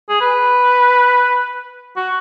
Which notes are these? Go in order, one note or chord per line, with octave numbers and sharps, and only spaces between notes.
G#4
B4
F#4